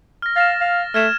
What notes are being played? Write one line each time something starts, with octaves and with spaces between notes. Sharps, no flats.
F6 A#6
F5 A6 A#6 E7
F5
A3 F6 G#6 E7